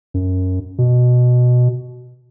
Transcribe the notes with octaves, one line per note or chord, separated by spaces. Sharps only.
F#2
B2